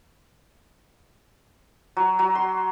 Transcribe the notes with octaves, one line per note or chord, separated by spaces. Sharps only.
F#3
F#3
C6